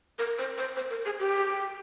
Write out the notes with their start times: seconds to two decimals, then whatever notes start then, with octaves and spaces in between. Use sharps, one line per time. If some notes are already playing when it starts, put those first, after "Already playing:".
0.19 A#4
0.38 C5
0.58 C5
0.77 C5
0.90 A#4
1.05 G#4
1.20 G4